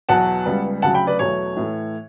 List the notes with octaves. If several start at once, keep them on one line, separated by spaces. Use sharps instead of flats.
E2 B2 F#3 F#5 A5
C#2 C#3 G3 B3
D2 C#3 F#3 F#5 A5
G5 B5
B4 D5
E2 B2 F#3 A3 C#5
A2 E3 A3